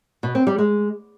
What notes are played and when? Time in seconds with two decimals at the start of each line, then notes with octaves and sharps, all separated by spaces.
0.23 B2
0.35 C4
0.47 G3
0.58 G#3